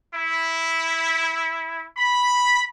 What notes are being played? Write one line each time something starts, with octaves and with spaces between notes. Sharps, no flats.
E4
B5